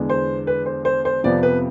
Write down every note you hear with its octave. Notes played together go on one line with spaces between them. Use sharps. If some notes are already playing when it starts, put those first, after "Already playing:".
Already playing: E2 D3 G#3 B3
C5
B4
C5
C5
C5
F2 C3 F3 B3 D5
B4